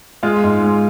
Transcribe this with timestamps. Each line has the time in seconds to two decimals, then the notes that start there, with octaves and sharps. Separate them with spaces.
0.23 G#3 F4 F5
0.44 G#2
0.64 G#3